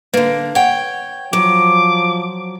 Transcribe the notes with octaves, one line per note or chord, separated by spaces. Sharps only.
D3 A#3 B4
C#5 F#5 G5
F3 F#3 D6